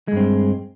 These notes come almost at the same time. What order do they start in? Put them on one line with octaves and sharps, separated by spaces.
G#3 G2 C4